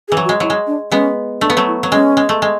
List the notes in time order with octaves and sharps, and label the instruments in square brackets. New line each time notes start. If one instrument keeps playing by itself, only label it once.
[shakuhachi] G#4
[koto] E3
F#3
[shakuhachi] F#4
[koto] G#3
[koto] F#3 [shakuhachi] E4
[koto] G#3
[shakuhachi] D4
[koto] G#3 B3 [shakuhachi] C#4
[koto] A3 [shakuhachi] D4
[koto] B3
F#3 A3
[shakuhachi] E4
[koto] F#3
[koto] G#3 [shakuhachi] C#4
[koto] G#3
A3
G#3